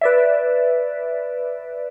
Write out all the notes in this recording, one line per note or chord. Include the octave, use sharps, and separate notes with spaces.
B4 D5 E5